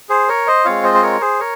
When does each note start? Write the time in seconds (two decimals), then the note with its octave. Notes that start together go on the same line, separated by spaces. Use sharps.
0.09 G#4 C5
0.29 A#4 C#5
0.47 C5 D#5
0.65 G#3 C4 F4 C#5 F5
0.84 C5 D#5
0.94 C5
1.02 A#4 C#5
1.21 G#4 C5
1.39 A#4 C#5